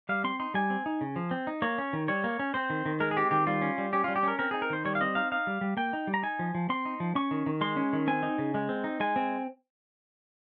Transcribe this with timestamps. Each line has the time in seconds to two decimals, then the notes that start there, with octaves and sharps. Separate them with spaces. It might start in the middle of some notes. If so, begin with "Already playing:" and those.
0.09 G3 F5
0.24 C4 C6
0.40 D#4 C6
0.54 G3 G#5
0.70 C4
0.86 D#4
1.01 C#3
1.16 F3
1.31 C4
1.47 D#4
1.62 A#3 C#5
1.78 C#4
1.93 D#3
2.08 G3 C#5
2.24 A#3
2.39 C#4
2.54 C4 C5
2.70 D#3
2.86 D#3
3.00 G#3 A#4
3.11 G#4
3.17 C4 G4
3.31 D#3 G4
3.47 G3 F4
3.62 C#4
3.78 G3
3.93 C#4 G4
4.04 G3 F4
4.16 G4
4.23 C#4 A#4
4.39 C4 A#4
4.51 D#4 G#4
4.62 A#4
4.70 D#3 C5
4.85 G3 C#5
4.95 F5
5.01 C4 D#5
5.15 D#4 F5
5.32 D#4 F5
5.47 G3
5.61 G3
5.77 A#3 G5
5.93 D#4
6.07 G3
6.14 A#5
6.23 D#4 G#5
6.39 F3
6.55 F3
6.69 C4 C6
6.85 D#4
7.00 F3
7.15 C#4 C#6
7.31 D#3
7.46 D#3
7.61 G#3 C6
7.76 C#4
7.93 D#3
8.07 C4 G#5
8.23 D#4
8.38 C#3
8.54 G#3
8.69 C4
8.84 D#4
9.00 G#3 G#5
9.16 C4